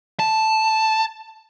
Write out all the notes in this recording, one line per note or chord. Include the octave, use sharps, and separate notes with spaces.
A5